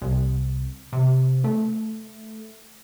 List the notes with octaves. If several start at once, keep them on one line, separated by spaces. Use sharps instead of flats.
C2
C3
A3